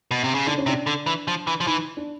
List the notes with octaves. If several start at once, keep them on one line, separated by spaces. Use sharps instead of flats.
B2
C3
C#3
D3 D4
C#4
C3 D4
D3
E3
F3
E3
F3
E3 D#4
D4